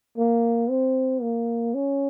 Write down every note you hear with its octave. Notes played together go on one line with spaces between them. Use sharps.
A#3
C4
A#3
C#4